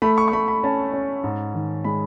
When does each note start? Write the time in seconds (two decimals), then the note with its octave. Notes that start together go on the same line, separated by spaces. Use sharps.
0.02 A3 B5
0.18 C#6
0.28 C#6
0.33 A3 B5
0.48 B5
0.64 C#4 A5
0.93 C#4
1.24 G#2
1.54 D#3
1.84 G#3 B5